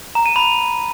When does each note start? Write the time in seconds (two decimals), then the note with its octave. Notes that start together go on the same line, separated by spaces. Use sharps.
0.15 A#5
0.26 D#7
0.36 B5